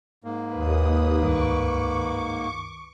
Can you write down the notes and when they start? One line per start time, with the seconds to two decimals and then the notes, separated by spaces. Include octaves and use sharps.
0.24 G#2 A#3
0.54 D#2 B4 D#6
1.23 C#2 G2 D#3 C#6 D6